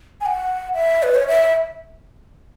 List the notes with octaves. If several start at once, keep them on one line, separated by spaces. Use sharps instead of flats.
G#5
F#5
E5
B4
C#5
E5